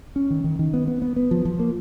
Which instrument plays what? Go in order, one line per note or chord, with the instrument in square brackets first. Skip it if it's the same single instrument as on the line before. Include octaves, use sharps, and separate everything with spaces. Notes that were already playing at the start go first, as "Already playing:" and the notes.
[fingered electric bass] C#4
D#3
D#3
D#3
B3
B3
B3
B3
F3
F3
A#3